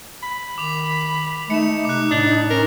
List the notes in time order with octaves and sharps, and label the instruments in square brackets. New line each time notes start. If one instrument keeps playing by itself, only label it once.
[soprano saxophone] B5
[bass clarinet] D#3 [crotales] D6 F7
[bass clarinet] A3 [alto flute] D#4 [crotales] C#7 E7
[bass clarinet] C3 [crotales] D6 F#6
[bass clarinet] A2 [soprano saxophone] D4
[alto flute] C#4 [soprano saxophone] A#4